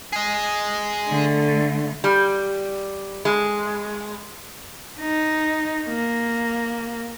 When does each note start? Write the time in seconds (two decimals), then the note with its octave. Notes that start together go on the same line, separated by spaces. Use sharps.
0.13 G#4 D#5
1.09 D3 A3
2.04 G3
3.25 G#3
4.99 D#4
5.88 A#3